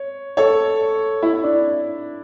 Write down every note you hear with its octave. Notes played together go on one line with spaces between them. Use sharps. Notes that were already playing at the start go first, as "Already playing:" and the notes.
Already playing: C#5
A4 C#5
E4
D4